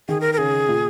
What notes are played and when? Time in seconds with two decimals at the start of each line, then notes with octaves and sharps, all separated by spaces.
0.09 D#3 G#4
0.21 A#4
0.33 A#4
0.38 C#3 G#4
0.69 A#2